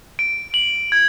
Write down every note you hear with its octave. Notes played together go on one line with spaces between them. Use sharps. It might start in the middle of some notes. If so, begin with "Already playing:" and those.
D7
F#7
G#6